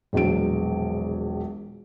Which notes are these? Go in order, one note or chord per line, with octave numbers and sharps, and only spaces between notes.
E1 A#1 F#3 D7